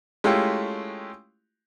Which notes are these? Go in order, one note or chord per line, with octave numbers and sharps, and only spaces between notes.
G#3 A3 C#4 E4 F4 G4